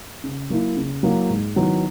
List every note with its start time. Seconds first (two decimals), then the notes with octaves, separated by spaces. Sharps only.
0.24 C#3
0.50 F#3 A#3 E4
0.77 C#3
1.03 F#3 A#3 E4
1.30 G#2
1.56 D#3 F#3 B3 E4